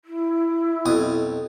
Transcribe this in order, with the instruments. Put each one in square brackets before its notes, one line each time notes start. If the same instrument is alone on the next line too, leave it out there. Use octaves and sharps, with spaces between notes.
[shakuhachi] E4
[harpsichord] B1 F2 D#6